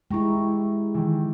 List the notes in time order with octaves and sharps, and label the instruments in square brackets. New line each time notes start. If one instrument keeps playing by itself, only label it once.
[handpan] G#3 E4 [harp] G4 A#5 C#6
[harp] D#3 E3